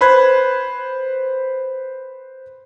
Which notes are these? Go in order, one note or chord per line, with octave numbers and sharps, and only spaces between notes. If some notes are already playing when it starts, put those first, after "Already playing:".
B4 C5 B5 F#6 G#6